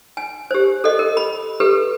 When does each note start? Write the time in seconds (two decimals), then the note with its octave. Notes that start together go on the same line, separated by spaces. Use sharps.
0.17 G#5
0.51 G4 C5
0.84 A4 D#5
0.99 A#4
1.17 B5
1.60 G4 A4 B4